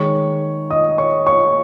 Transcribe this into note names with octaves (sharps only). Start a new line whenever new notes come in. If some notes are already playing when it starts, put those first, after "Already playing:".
Already playing: D#3 G#3 C#5 C#6
D#5 D#6
C#5 C#6
C#5 C#6